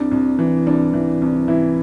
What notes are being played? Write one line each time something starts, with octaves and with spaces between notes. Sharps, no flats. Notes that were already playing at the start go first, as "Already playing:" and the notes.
Already playing: C2 D4
C2
E3
C2 D4
E3
C2
E3 E4